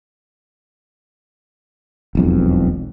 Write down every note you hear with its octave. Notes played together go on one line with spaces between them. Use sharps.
E1 B1 F2